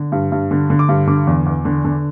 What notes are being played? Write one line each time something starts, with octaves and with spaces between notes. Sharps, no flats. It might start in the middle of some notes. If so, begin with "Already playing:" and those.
Already playing: D3
G2
G2
D3
D3
D6
G2
D3 D6
E2
E2
D3
D3